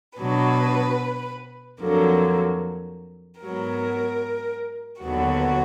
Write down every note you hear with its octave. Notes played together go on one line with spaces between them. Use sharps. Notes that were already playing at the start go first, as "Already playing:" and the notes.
B2 F#3 D4 B4
F2 D3 F#3 A#3
G#2 F#3 B3 A#4
D#2 D3 F#3 B3 F#4